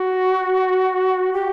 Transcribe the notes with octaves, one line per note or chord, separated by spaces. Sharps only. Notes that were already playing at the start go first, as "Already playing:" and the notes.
Already playing: F#4
G4